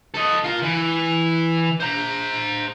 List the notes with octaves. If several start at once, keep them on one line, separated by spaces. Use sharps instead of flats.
A4 D#5
F4 A#4
E3
C5 A#5